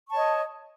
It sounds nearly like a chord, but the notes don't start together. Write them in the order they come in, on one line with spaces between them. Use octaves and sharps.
C#6 A5 C#5 D#5